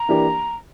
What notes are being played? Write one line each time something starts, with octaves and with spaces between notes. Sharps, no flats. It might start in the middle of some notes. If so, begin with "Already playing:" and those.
Already playing: A#5
E3 A#3 D4 G4